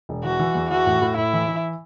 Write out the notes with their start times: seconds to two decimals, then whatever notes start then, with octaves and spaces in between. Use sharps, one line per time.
0.09 E1
0.24 E3 F#4
0.39 E3
0.55 E2
0.71 E3 F#4
0.86 A2
1.02 A2
1.17 A2 E4
1.33 E3
1.48 E3